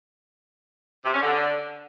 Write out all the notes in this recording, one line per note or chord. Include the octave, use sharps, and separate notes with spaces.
C3
C#4
D3